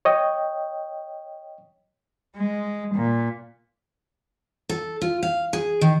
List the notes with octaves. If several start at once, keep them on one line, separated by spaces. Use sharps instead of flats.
C#5 D#5 G5
G#3
A#2
A4
F4
F5
G#4
D#3